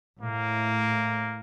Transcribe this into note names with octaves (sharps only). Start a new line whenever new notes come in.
A2 A#3